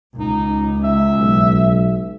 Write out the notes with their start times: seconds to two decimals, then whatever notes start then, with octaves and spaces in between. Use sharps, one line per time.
0.19 C#2 D#4
0.84 E5
1.17 B1